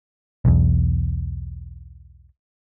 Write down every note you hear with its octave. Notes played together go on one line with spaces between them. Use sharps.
B1 E2